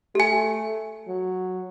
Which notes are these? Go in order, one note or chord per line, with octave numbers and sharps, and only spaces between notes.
A3 G4 G#5
F#3